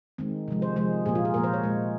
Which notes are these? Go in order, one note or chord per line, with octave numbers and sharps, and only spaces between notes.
D#3 G#3 C4
C3 F3 G#3
C5
C3 F3 G#3 C5
A#2 F3 A#3 G#4
F4
G#4
A#2 F3 A#3 A#4
C5
C#5
A#2 G#3